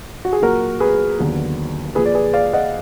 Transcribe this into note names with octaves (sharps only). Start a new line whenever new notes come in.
F#4
G#4
A#2 F#3 A#3 F#4 A#4
G#4 B4
D#2 D3 F#3 B3
A#2 F3 A#3 G#4 B4
D5
G#4 B4
D5 F5
D#5 F#5